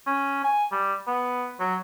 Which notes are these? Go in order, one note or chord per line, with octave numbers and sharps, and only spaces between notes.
C#4
G#5
G3
B3
F#3